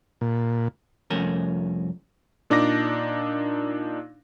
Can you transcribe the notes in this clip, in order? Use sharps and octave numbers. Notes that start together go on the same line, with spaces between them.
A#2
C2 F2 F3 A3 C#4 A#4
A#2 D4 D#4 D6 A#6